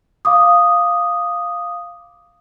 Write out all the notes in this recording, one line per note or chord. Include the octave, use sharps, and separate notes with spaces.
F5 D6 D#6